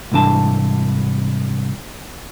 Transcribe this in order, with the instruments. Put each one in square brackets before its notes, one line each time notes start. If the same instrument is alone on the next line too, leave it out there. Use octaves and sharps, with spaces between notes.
[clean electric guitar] C2 G#2 E3 D4 A5